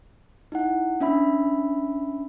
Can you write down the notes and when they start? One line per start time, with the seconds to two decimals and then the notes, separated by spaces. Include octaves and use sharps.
0.52 D#4 E4 F#5
1.00 C#4 D4 E5 B5